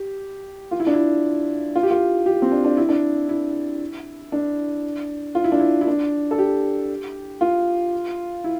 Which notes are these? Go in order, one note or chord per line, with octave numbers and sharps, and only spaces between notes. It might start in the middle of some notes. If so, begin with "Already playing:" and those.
Already playing: G4
F4
E4
D4
E4
F4
G4
F4
G4
C4
D4
D4
E4
D4
E4
D4
F4
E4
D4
E4
E4
D4
A4
G4
F4
E4